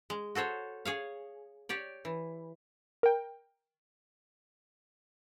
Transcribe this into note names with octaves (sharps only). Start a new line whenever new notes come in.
G#3
F#4 A4 C5 C#5
G#4 C#5 F5
G4 C#5 D5
E3
A#4 G5